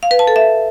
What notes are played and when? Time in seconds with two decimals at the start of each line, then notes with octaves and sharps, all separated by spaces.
0.03 F5
0.11 B4
0.19 A5
0.27 A4
0.36 E5